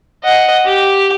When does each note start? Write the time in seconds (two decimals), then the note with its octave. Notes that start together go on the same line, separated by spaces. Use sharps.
0.24 D#5 F#5
0.65 G4